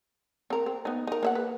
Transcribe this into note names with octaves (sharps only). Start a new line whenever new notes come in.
C4 A#4
C4
B3 D#4
D#4 A#4
A#3 E5 F#5
B4